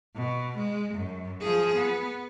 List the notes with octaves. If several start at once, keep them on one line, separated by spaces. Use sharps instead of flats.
B2
G#3
F#2
F3 G#4
B3